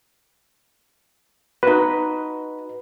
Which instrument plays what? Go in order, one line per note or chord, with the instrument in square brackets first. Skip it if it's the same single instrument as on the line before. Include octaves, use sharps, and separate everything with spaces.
[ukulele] D#4 F#4 [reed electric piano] B4